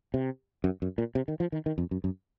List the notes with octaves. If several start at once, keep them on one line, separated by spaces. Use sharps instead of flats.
C3
F#2
F#2
A#2
C3
D#3
F3
D#3
D#3
F2
F#2
F#2